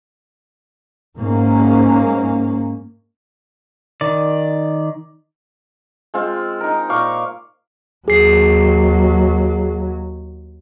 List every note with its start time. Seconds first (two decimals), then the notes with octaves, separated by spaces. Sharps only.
1.18 G#2 A#3 C#4
4.01 D#3 D5
6.14 G#3 C4 F4
6.60 D#4 A#4
6.89 A#2 F5 C#6 D6
8.08 D#2 F#3 G#4 C7